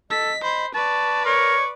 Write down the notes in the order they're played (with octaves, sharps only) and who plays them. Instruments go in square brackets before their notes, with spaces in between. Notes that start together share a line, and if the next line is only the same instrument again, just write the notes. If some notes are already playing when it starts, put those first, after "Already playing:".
[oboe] A4 [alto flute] D#5 [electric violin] B6
[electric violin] C5 [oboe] B5
[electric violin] B4 D5 [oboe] A5 [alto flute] C#6
[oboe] A#4 [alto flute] C#5 [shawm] C#6